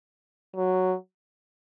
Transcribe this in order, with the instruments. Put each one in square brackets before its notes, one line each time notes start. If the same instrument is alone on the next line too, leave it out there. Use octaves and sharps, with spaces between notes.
[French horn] F#3